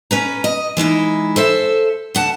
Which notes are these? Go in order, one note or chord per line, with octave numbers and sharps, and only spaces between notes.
C#4 B4 A#5
D#5
E3 G#3 D#4 E4
A4 C5 E5
D2 F#5 A5